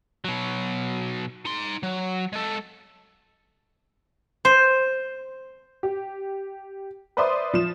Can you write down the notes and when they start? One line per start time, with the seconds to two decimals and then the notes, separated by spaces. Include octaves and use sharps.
0.25 B2 F#3
1.45 D#4 C6
1.83 F#3
2.33 G#3 A4
4.45 C5
5.83 G4
7.17 B4 C5 D5 E5 C6 D#6
7.54 F3 E7